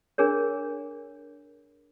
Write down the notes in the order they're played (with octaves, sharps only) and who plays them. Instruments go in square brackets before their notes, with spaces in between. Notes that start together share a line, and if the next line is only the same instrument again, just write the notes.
[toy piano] D4 G#4 A#4 C#5